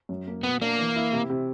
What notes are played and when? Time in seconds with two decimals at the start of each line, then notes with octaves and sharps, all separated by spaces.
0.09 F#2
0.27 A#3
0.43 B2 B3
0.61 A#3 D4
0.78 E3
0.96 E4
1.13 C3
1.30 C3